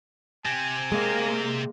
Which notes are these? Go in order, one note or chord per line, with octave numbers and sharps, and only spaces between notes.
C3 C4 G#5
G#3 A#3